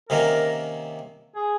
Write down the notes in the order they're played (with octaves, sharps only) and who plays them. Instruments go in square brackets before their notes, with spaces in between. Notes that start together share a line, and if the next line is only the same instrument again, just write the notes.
[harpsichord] C3 D#3 A#3 C#4 [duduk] A#4
[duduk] G#4